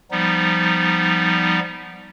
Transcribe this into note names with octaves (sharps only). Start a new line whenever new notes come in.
F3 G3 B3 D#4